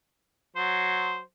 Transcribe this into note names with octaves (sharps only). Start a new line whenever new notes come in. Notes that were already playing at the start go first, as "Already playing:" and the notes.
F#3 C5